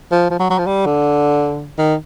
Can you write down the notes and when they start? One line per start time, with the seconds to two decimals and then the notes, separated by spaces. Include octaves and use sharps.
0.12 F3
0.30 F3
0.40 F#3
0.50 F#3
0.58 F3
0.67 G3
0.86 D3
1.78 D#3